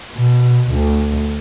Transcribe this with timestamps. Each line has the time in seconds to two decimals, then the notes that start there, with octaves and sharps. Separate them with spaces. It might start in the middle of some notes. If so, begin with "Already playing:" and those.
0.13 B2
0.70 D2